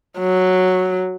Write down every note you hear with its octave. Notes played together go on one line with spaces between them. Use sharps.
F#3